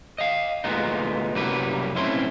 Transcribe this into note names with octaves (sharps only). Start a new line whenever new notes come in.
D#5 F5
D2 A#2 G#3 B3 D#4
C2 F#2 F#3 G3 A#3 B4
B1 A2 C4 C#4 E4 C6